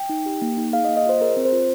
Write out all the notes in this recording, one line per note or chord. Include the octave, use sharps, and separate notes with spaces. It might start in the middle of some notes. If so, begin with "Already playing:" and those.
Already playing: G5
D#4
G4
A#3
D#4
G#4 F5
D#5
A#3
D#5
F4 C5
G#4 A#4
C4
C5
F4